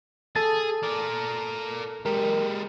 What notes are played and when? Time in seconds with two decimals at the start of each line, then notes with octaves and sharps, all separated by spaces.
0.36 G#4 A4 A5 A6
0.83 A#4 D5
2.06 G#3 G4 A#4